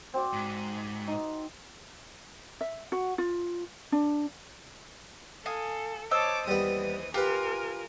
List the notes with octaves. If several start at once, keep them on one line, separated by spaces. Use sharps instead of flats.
C4 F#4 D5
G#2
D#4
E5
F#4
F4
D4
A4 F5 G#5 D#6
C5 C#5 D#5 A5 D6 E6
D#2 E3 G3 B3 D#6
F4 G4 A#4 B4 G#5